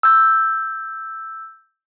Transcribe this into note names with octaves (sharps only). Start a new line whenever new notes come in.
E6 G6